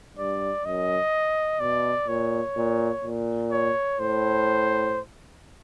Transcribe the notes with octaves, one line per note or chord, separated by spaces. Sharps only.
G2 D5
F#2 D#5
B2 D5
A#2 C#5
A#2
A#2
C#5
A2 C5